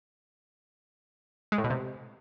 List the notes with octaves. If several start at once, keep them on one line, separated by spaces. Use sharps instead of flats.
G#3
A2
B2
C3